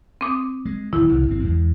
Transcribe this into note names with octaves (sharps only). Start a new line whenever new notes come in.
C4 D6 D#6
G#3
D1 D#3 E4
C2
G#1 C4
E2 G#3